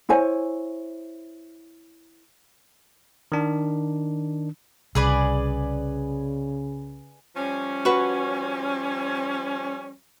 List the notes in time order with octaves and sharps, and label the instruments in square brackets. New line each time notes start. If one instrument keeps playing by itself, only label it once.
[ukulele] E4 C5 C#5 G#5
[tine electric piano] D#3 D4
[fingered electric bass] C2 [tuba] C#3 [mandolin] G#4 B4 D5
[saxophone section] F3 G3 C#4
[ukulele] F#4 B4